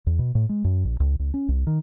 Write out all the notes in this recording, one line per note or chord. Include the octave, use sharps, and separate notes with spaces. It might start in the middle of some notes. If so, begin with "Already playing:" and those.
E2
B2
A2
G#3
F#2
A#1
C#2
C#2
C#4
C2
D#3